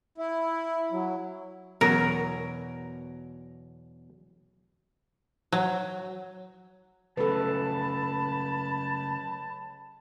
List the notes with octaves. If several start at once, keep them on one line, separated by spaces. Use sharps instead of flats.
E4
F#3
E2 B2 F#3 A#4
F#3
C#2 C#3 F#3 A3 A4 B4 A5 B5